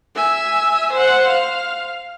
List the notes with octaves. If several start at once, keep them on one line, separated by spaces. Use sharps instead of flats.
E5 G#5
C5 F#5
F5